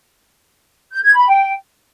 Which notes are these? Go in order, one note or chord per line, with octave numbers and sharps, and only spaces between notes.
G6
G#6
B5
G5